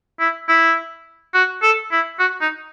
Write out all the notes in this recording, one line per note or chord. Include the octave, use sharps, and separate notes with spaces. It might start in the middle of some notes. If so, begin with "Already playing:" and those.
E4
E4
F#4
A4
E4
F#4
D#4